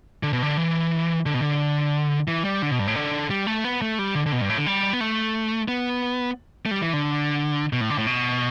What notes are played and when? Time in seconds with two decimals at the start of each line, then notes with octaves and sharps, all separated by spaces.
0.23 D3
0.33 B2
0.42 D3
0.57 E3
1.26 D3
1.34 B2
1.42 D3
2.28 E3
2.44 G3
2.62 D3
2.71 B2
2.79 G2
2.87 A2
2.95 D3
3.30 G3
3.47 A3
3.64 B3
3.82 A3
3.99 G3
4.15 D3
4.26 D3
4.32 B2
4.41 G2
4.49 A2
4.58 D3
4.66 G3
4.93 B3
5.01 A3
5.68 B3
6.66 A3
6.71 G3
6.82 E3
6.93 D3
7.73 B2
7.81 A2
7.90 D3
7.98 A2
8.07 B2